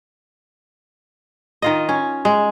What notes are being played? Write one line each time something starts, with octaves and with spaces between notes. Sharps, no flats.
D#3 F4 D#5
C#4
G#3